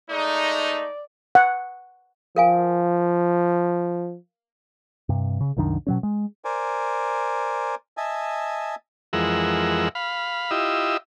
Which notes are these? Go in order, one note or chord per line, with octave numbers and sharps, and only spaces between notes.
G#3 A3 D#4 D5
F#5
F3 A#4 F5 G#5
G2 C3
C#3
C2 F#2 D#3 D4
B2 F#3 C#4
G#3
A#4 C5 D5 G#5
D#5 E5 G#5 A5
F2 E3 G#3 A#4 F#5 E6
F5 B5
E4 F4 G4 D#5 E6